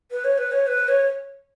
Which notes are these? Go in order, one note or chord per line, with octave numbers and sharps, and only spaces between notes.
B4
C#5
B4
C#5
B4
C#5